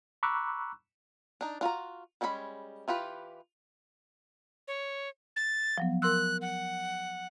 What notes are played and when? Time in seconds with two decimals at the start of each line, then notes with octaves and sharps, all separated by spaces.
0.23 A#5 B5 C#6 D6 E6 F#6
1.41 D4 D#4
1.61 D4 F4 F#4 A#5
2.21 G3 G#3 C#4 E4 B5
2.88 E3 F4 G4 B4
4.68 C#5
5.36 A6
5.78 F3 F#3 B3
6.02 A#4 C6 E6 F#6
6.41 F#5